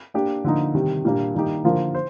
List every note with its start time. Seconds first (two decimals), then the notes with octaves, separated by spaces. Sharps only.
0.14 A#3 D4 G4
0.44 D3 F3 A#3 D#4
0.74 C3 D#3 G3
1.05 A#2 G3 A#3 D4
1.35 D#3 G3 A#3 D#4 G4
1.64 D3 F3 A#3 F4 A#4
1.95 C5